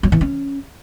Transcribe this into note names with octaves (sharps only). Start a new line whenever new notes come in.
F#3
E3
C#4